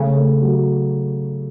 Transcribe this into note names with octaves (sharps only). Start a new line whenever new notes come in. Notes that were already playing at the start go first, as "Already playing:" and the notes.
Already playing: C#3 A3
A3
F#3